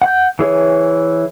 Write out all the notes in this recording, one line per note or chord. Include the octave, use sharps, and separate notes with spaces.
F#5 G6
E3 G#4 C#5